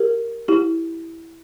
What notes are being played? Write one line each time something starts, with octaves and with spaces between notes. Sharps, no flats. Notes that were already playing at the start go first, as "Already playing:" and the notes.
Already playing: G4 A#4
E4 G4